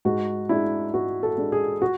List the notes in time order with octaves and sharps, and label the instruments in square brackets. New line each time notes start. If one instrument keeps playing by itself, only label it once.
[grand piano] G#2 F#4
G#3 D4 E4
G#2 F#4
A4
G#3 D4
G#4
F#4